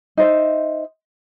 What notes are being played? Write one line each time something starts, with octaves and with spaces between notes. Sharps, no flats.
D#4 C5 E5